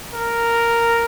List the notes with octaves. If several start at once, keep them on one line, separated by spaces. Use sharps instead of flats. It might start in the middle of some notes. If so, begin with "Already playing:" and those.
A#4